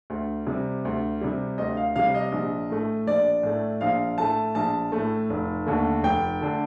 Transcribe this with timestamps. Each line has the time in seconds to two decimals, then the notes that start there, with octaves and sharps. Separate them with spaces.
0.10 D2
0.47 C3 G3
0.85 D2
1.21 C3 G3
1.58 D2 D#5
1.77 F5
1.96 C3 G3 F5
2.14 D#5
2.32 A#1
2.70 A2 A3
3.07 A#1 D5
3.43 A2 A3
3.81 A#1 F5
4.18 A2 A3 A5
4.55 A#1 A5
4.92 A2 A3
5.30 F1
5.66 D#2 D3 A3
6.03 F1 G5
6.41 D3 A3